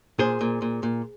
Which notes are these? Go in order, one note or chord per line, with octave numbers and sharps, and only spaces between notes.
A#2 G#4 C5
A#2
A#2
A#2